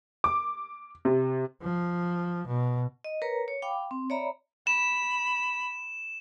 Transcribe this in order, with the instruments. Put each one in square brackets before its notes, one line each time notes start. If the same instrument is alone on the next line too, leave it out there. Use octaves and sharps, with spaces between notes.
[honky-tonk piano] D6
C3
[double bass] F3
B2
[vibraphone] D#5
A#4 B4 C#5 A#5
C#5
F5 G5 B5 D6
C4
C#5 D5 E5 A#5 B5
[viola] B5 [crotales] E7